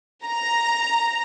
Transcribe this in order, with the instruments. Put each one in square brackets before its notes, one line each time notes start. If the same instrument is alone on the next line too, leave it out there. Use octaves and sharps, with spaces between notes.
[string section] A#5